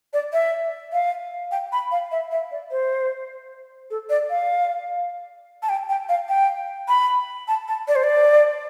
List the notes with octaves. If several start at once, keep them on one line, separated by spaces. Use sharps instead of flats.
D5
E5
F5
G5
B5
F5
E5
E5
D5
C5
A4
D5
F5
A5
G5
G5
F5
G5
B5
A5
A5
D5
C5
D5